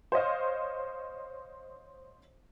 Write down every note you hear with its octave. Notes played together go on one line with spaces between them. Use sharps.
C5 C#5 D#5 F5